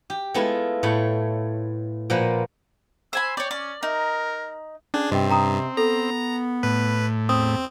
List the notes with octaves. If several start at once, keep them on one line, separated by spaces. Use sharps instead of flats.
G4
G#3 A3 B3 E4 F4
A2 A3 C#5 B5
A#2 F3 A#3 B4 F#5
C5 G#5 B5 E6
C#5 D5 G5
C#4 D5
D#4 A#4
C#4 D4 G#4
G2 C3 C4 D#5 G5
C3 G5 A#5 D#6
B3 A4 A#5
A2 B4
E2 C4 D#6